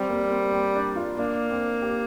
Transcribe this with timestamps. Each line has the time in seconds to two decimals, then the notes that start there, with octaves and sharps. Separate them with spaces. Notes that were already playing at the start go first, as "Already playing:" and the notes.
Already playing: G3 C4
0.10 A#3
0.31 C4
0.53 C4
0.75 D4
0.96 F4
1.18 A#3 D4
1.51 C4
1.82 G4